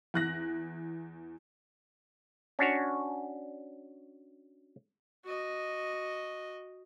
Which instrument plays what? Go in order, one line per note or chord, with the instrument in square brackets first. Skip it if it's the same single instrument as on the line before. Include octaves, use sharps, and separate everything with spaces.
[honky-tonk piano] E2 F#6 A#6
[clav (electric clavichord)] C#4 D4 F#4 C#5
[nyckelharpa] F#4 D#5